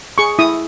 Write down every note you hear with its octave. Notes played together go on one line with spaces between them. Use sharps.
G#4 C#6
E4 D#6